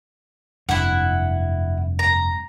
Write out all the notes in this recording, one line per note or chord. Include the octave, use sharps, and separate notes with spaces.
F1 G2 E4 F#5
A#5